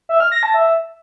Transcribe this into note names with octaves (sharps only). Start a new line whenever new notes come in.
E5
F6
A#6
A5
E5